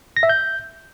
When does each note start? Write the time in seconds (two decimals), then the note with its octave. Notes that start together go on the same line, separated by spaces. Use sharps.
0.17 A#6
0.23 E5
0.29 G6